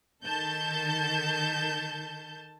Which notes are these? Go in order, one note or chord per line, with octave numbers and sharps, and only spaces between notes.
D#3 A4 A5 G6